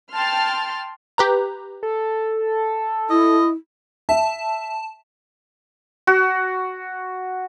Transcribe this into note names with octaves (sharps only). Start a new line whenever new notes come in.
G5 A5 C6 F6
G4 B4 A#5
A4
E4 D#5
E5 A5
F#4